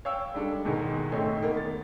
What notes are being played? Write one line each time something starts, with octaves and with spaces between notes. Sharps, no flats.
C#5 F5 G5 E6
G3 G#3 D4 A4
E2 G#2 B2 D#3
A1 A3 C4 D#4 C#5
D#3 A#3 B3 D#4
A6